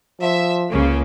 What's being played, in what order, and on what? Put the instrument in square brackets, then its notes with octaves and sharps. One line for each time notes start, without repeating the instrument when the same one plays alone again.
[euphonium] F3 [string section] E5
[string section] C#2 C#3 A#3